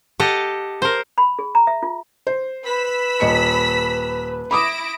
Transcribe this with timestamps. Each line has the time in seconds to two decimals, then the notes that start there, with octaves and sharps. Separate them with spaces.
0.19 G4 A4 D#5 F#5
0.82 A#4 C5
1.18 B5
1.39 G#4
1.55 A#5
1.67 E5
1.83 F4
2.27 C5
2.64 B4 B5 E6 B6
3.20 D#1 D#5 C#7
4.51 E4 B5 D6 D#6 A#6 D7